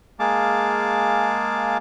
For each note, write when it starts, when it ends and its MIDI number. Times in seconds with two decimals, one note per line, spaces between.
0.20 1.78 56
0.20 1.78 58
0.20 1.78 68
0.20 1.78 77
0.20 1.78 81
0.20 1.78 86